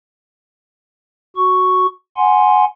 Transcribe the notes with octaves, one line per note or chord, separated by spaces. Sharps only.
F#4 C#6
F#5 G#5 C6